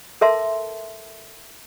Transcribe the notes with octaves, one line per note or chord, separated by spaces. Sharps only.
A4 A#4 E5 A5 C6